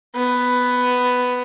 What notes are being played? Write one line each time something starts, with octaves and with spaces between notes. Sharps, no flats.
B3